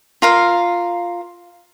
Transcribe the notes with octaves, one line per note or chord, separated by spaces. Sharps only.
F4 A#4 F5